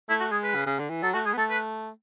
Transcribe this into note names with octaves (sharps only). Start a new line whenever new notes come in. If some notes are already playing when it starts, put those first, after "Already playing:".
A3 E4
F#4
G#3 G#4
B4
C#3
C#3
D3
E3
F#3 A4
A3 F#4
G#3 G#4
B3
A3 A4
B4